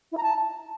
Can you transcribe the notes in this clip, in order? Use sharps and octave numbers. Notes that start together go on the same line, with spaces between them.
E4
A#5
A5